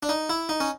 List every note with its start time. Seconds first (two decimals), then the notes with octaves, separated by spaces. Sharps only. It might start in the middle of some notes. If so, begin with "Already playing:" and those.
0.03 D4
0.09 D#4
0.30 E4
0.49 D#4
0.60 C#4